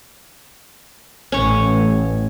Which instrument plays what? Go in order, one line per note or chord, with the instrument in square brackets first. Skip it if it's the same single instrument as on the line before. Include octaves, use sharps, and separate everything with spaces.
[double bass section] A1 [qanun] C#4 C#5